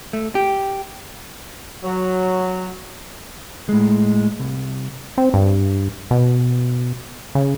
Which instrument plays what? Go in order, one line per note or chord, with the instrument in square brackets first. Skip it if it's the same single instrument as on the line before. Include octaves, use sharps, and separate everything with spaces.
[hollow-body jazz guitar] A3
G4
[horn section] F#3
[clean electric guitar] A2 G#3
C2
[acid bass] C4
G2
B2
C#3